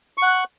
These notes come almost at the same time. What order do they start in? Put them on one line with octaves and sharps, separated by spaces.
C#6 F#5 F#6